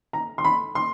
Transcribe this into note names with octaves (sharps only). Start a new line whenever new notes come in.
A#5
C6
B5
C6